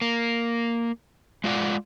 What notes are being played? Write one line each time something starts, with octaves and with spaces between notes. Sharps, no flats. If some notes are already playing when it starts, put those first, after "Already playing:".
A#3
G#3 F4 D5 F#5